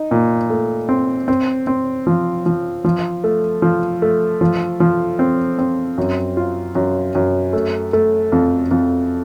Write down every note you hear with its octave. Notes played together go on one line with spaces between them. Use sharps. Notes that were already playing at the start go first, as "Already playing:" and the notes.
Already playing: D#4
A#2
A3
C4
C4
C4
F3
F3
F3
A3
F3
A3
F3
F3
C4
C4
F#2
F4
F#2
F#2
A3
A3
F2
F2